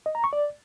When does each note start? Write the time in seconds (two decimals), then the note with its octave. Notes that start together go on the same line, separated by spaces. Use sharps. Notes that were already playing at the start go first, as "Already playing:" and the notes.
0.06 D#5
0.15 A#5
0.24 C#6
0.33 D5